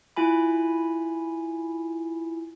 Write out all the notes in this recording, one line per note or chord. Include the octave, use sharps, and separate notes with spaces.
E4 F4 G#5 B5